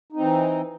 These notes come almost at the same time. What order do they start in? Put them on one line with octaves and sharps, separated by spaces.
D#4 C4 E3